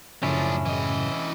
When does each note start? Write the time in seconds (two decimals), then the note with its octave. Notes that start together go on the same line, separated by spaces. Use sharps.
0.23 F#2 A2 C#3 F3 C#4 D4 E4
0.66 E3 D#5